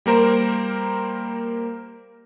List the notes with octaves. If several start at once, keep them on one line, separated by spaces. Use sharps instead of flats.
G3 A#3 A#4 C5